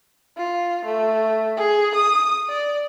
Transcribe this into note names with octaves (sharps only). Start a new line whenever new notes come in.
F4
A3
G#4
D#6
D5